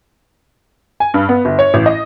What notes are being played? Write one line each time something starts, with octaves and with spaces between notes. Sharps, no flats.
G#5
G2
B3
G1
C#5
A1
D#5